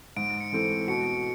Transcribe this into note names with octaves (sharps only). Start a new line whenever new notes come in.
G#2 D7
C#7
E3 A3 C4
B2 C#7